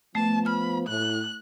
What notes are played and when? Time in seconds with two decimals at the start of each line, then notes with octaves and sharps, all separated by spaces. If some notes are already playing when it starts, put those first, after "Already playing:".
0.15 F3 A3 B3 A5
0.46 B5 F6
0.88 A2 F#6